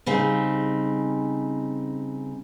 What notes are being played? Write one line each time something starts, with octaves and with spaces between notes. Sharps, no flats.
C#3 G3 C4 D#4